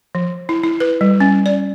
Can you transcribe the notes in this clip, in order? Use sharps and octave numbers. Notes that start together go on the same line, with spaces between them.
F3
E4
E4
B4
G3
C#4
D5